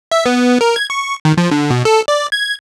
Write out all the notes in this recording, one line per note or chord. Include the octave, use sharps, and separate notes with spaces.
E5
B3
A#4
G#6
C#6
D#3
F3
D3
B2
A4
D5
G#6